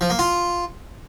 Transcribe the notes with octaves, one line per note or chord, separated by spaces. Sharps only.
F3
A#3
F4